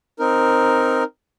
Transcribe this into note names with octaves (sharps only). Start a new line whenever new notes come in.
C4 D#4 A#4